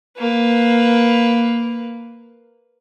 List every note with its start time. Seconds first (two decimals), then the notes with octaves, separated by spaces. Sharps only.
0.18 A#3 B4